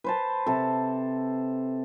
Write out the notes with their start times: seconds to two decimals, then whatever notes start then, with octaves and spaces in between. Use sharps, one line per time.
0.04 B4 C5 A5
0.46 C3 A4